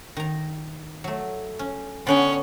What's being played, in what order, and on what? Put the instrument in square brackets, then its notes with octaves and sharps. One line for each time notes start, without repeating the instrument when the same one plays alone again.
[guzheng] D#3 A#5
F#3 A3
C#4
[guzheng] D3 B3 G5 [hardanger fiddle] C#4